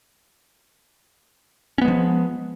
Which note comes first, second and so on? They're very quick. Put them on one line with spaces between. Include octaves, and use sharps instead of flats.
C#4 B3 G#3 F3